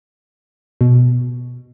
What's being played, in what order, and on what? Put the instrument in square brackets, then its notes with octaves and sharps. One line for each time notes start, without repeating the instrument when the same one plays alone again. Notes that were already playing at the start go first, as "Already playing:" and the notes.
[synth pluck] B2